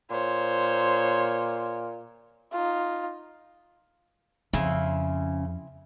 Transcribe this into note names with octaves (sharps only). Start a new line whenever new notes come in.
A#2 C5 C#5
D#4 F4
F2 C#3 C4 E4